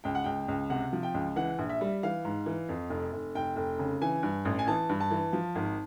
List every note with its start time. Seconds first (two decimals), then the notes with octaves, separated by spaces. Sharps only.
0.04 C#2 G5
0.15 F#5
0.24 C#2 G5
0.48 C#2
0.70 C3 F#5
0.93 F3
1.03 G5
1.14 C#2
1.36 E3 F#5
1.59 A#1
1.69 E5
1.81 G3
2.03 E3 F5
2.25 G#2
2.46 E3
2.69 F2
2.90 F1
3.13 F1
3.35 F1 G5
3.56 F1
3.79 C#3
4.02 E3 G#5
4.23 G2
4.45 A1
4.59 G#5
4.68 E3 A5
4.89 G2
5.00 A5
5.11 E3
5.33 F3
5.55 G#1